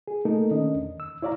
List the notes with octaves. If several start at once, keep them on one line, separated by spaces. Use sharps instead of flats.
G#4
A3 A#3 D#4 A4 A#4
D#3 C#4 D4 D#5
E2
E6
E4 C#5 D5 F5 A#5